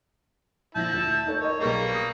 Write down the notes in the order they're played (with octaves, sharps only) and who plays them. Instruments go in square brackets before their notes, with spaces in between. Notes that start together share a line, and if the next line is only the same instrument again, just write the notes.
[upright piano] A#1 F3 A#6 [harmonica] E4 A5 [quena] G6
[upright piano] D2
D#4 A4 C#5
[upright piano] A#4 D#5 [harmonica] C#5
[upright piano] B1 B4 C#6 [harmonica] G3 A#3 [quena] G#4
[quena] D#6